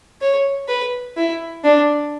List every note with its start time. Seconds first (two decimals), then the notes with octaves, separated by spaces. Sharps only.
0.21 C#5
0.68 B4
1.17 E4
1.64 D4